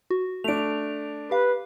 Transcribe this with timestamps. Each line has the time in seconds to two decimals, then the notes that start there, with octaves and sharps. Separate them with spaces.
0.10 F#4
0.44 A3 D4 D7 F7
1.31 G4 B4 F5